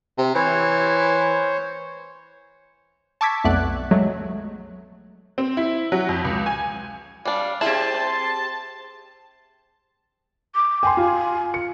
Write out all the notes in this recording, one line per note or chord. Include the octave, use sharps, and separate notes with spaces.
C3
E3 C5 C#5
A5 C#6 D6 E6 G#6 B6
B1 F2 A3 B3 D5 F#6
F#3 G#3 A3
C4
E4
F#3
F2
C#2
G#5
G3 D4 F5
C4 E4 G4 G#4 A5 C6
C5
D6
G5 G#5 C6
F4
C#7